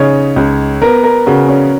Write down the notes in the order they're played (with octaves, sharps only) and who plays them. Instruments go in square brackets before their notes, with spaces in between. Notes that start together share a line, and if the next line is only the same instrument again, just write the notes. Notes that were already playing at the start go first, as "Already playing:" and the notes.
Already playing: [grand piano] C#3 [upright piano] D#4 C#5
[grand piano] C#2
[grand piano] B3 [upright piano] A#4
[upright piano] A#4
[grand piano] C#3 [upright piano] F#4
[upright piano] C#4